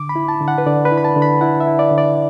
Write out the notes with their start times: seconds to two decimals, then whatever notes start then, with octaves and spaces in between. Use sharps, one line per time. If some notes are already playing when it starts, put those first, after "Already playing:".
Already playing: D3 D6
0.09 B5
0.16 E4
0.28 A5
0.41 D3
0.48 F#5
0.58 B4
0.66 D3 D5
0.85 B4
0.91 E4
0.98 B5
1.04 A5
1.16 D3
1.22 B5
1.41 E4 F#5
1.60 E5
1.67 E4
1.79 D5
1.91 D3
1.98 D5